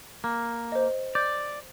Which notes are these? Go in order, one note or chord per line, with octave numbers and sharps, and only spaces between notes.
A#3
C5 D#5
D5 G6